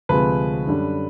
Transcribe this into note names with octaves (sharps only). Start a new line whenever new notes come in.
D2 C3 F3 G#3 B4
F#2 D3 G3